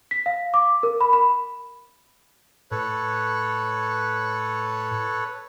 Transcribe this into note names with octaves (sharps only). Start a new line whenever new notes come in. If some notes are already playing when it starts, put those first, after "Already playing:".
B6
F5
D6
A#4
B5
B5
A2 A4 B4 C#5